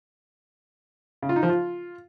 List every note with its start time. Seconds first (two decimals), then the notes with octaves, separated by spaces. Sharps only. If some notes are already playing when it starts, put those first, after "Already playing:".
1.23 C#3
1.29 F4
1.36 D#4
1.43 F3
1.49 F4